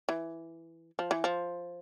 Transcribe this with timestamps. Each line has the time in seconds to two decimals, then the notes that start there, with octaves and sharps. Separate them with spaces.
0.09 E3
0.99 F3
1.11 E3
1.24 F3